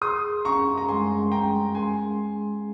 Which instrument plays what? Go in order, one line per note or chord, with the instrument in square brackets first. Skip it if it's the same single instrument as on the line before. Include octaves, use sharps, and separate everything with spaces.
[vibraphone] G#4 [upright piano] C6 D#6
[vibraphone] C#4 [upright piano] A#5 C#6
[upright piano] A#5
[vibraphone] G#3 [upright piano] G#5 C6
[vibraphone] C#4 [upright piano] G5 A#5
[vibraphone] G#4 [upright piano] G#5 C6
[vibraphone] C#4